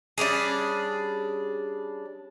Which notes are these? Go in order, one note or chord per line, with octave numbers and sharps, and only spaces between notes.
G3 C#4 D4 G#4